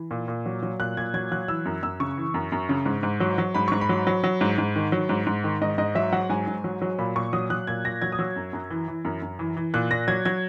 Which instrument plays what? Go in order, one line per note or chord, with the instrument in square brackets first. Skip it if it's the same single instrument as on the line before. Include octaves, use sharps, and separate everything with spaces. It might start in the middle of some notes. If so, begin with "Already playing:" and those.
Already playing: [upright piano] E3
A#2
A#2
F#3
F#3
A#2 F#6
A#2 G#6
F#3 G#6
F#3 F#6
E3 E6
F#2
F#2 E6
C#3 C#6
E3
F#2
F#2
C#3
G#2
G#2
F#3
F#3
G#2 B5
G#2 C#6
B5
F#3
F#3
F#3
G#2
G#2
D#3
F#3
G#2
G#2
D#3
G#2 D#5
G#2 D#5
F#3 E5
F#3 F#5
G#2 G#5
G#2
F#3
F#3
A#2 B5
A#2 C#6
F#3 D#6
F#3 F#6
A#2 G#6
A#2 A#6
F#3 G#6
D#6
F#3 E6
F#2
F#2
E3
E3
F#2
F#2
E3
E3
A#2 F#6
A#2 A#6
F#3 G#6
F#3 G#6